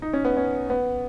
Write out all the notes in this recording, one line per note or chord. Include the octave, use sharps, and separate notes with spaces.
D#4
C#4
B3
C#4
B3